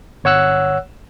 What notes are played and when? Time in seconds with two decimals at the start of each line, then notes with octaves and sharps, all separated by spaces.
0.24 G1 C#5 F#5 E6 F#6